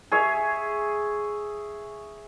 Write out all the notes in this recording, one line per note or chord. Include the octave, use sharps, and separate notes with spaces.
G#4 C#5 E5